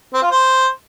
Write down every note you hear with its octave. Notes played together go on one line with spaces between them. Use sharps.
C4
F4
C5